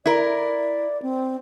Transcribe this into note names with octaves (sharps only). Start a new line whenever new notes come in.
E4 A#4 D5
C4